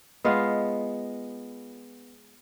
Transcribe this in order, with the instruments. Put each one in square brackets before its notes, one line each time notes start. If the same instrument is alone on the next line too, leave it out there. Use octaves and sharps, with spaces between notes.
[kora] G#3 B3 F4 F5